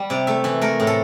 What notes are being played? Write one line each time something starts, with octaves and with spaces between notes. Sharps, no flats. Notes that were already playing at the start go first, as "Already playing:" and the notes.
Already playing: G3
C3 D5
A3 E5
E3 E5
A3 A#4
A2
A4